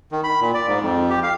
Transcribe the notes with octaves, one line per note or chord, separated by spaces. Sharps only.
D#3
B5
A#2
D5
G#2
F2
G4
F5